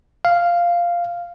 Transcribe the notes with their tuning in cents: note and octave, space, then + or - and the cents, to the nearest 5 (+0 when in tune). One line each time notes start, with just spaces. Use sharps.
F5 -5